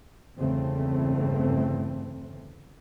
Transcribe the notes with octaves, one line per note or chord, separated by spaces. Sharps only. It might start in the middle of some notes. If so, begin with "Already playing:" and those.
G1 E2 C#3 E3 A3 C4